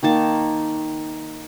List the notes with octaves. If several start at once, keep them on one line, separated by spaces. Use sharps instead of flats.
D#3 A#3 A5